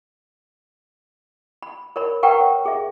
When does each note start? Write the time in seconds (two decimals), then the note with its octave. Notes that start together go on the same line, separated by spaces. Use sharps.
1.63 B5
1.96 A#4 C#5 B5
2.23 A#4 B4 F#5 G5 A#5 C#6
2.41 C#5
2.66 G#4 E5